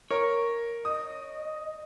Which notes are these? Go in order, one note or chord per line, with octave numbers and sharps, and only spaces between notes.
A#4 C#5
D#5 D#6